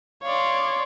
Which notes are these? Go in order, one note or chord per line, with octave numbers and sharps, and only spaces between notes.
C#5 D5 F5 C6